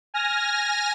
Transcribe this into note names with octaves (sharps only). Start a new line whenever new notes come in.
G#5 F6 A#6